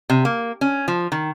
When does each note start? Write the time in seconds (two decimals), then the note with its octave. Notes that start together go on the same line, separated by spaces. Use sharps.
0.10 C3
0.25 A#3
0.61 C#4
0.88 F3
1.12 D#3